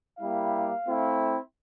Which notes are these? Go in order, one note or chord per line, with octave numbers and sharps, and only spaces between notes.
G3 A#3 E4 G4 F5
A3 C4 E4